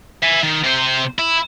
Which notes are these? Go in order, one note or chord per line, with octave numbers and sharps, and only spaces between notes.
E5 G#5
D#3
C3 C5
E4